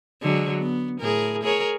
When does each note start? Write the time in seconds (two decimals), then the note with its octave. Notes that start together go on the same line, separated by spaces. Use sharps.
0.22 D3 F#3 G#3
0.59 B3
1.00 A2 G#4 A#4
1.43 G#4 A#4 C#5